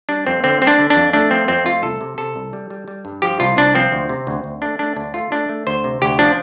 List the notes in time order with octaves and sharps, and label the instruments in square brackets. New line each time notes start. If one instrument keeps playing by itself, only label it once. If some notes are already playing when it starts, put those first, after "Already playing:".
[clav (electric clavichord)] G3 D4
F2 C4
D3 C4
G3 C4
D4
D3
D4
F2
A3 D4
F3 C4
F2 C4
A3 F4
C2 A4
C3
C3 A4
C2
G3
G3
G3
G2
F3 G4
C2 F4
C2 D4
F3 C4
D2
C3
D2
D2
A3 D4
A3 D4
D2 D4
A3 F4
A3 D4
A3
D2 C5
C3
D2 G4
F3 D4